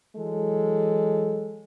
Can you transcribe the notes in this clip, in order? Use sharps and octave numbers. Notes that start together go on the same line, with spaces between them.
E3 F#3 G#3 A4